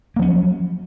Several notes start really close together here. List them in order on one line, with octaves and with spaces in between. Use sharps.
A#3 F3 C#4 F#3